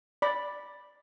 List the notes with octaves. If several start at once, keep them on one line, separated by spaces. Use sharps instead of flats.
D5 B5